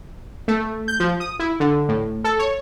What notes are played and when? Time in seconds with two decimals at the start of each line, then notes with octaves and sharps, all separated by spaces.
0.48 A3
0.88 G6
1.00 F3
1.20 D#6
1.39 E4
1.60 D3
1.89 A2
2.24 A4
2.39 C#5